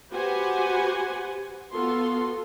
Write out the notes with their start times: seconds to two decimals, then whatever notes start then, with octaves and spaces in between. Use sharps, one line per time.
0.10 F#4 G4 B4 C5 F#5 G#5
1.73 B3 F4 F#4 A4 C6